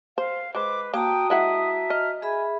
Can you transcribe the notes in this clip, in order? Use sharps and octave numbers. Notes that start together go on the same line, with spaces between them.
C5 F5
G#3 B4 C5 D6
A#3 F#4 G5 A5 A#5 D#6
G#3 E4 E5 F#5
D#5 F6
G#4 E5 G#5 B5